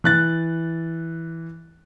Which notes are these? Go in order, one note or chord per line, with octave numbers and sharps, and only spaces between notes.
E3 F#6 A6